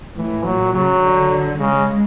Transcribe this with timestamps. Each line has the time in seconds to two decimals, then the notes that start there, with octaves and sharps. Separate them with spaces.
0.16 A2 E3
0.44 A#2 F#3
0.73 C#3 F#3
1.02 D3
1.58 C#3 G#3